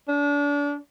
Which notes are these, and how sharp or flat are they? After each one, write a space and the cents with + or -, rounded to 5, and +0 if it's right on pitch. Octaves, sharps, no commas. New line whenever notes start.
D4 -30